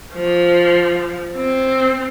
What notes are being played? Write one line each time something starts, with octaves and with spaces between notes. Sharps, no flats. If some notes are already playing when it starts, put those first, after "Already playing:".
F3
C4